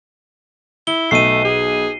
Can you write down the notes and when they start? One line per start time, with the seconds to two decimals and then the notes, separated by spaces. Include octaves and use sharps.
0.87 E4 G7
1.11 B1 A3 C7 D#7
1.44 G#4